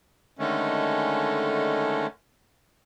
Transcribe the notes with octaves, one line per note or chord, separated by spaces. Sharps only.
D3 D#3 G#3 A3 C#4